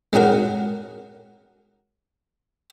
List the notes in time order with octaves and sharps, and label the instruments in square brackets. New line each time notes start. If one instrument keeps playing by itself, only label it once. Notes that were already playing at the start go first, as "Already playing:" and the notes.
[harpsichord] G#3 C#4 D#4 F#4 A#4